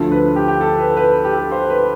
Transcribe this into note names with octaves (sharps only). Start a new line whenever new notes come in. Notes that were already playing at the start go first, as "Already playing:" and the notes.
Already playing: D2 D3 F3 A4
B4
G4
G4
A4
B4
B4
G4
A4
C5
B4